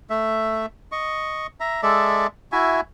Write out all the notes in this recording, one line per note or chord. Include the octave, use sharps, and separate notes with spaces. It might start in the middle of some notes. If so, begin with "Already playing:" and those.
A3 E5
D#5 C#6
E5 A#5
G#3 A4 D5 E5
E4 F#4 E5 G#5